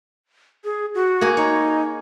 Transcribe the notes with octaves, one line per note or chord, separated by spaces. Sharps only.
G#4
F#4
A#3 G#4
D#4 C#5